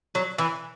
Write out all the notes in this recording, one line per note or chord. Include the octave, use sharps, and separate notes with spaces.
F#3
E3